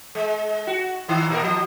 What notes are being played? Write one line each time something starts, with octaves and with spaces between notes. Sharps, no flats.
G#3
F#4
G#2 D#3
A#2 A#4
F3